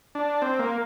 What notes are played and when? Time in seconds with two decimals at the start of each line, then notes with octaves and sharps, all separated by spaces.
0.15 D4
0.42 C4
0.59 A#3